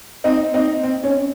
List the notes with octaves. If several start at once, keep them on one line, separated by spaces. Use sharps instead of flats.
C4 D#4
C4 D#4
C4
C#4